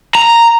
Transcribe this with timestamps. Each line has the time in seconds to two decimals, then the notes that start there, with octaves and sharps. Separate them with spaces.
0.15 A#5